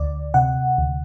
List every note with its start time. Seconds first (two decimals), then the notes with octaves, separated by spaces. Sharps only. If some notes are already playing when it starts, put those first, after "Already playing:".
Already playing: D2 D5
0.34 C3 F#5
0.78 D2